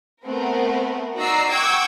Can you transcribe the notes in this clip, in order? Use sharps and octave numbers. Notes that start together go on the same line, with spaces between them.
A3 B3 C4 A#4
D#4 F#4 D5 A#5 E6 C7
F#5 G5 C#6 D6 E6 G#6